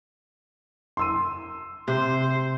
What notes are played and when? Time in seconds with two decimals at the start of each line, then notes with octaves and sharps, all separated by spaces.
0.97 C6 E6 D#7
1.88 C3 C5